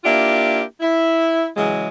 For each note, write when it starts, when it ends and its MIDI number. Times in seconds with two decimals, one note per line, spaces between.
0.04 0.62 58
0.04 0.62 62
0.04 0.62 64
0.04 0.62 65
0.04 0.62 67
0.80 1.47 64
1.57 1.88 49
1.57 1.88 52
1.57 1.88 54
1.57 1.88 56